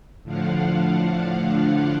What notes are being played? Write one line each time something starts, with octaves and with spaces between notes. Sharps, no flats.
A2 D3 F3 D4 F5 F#5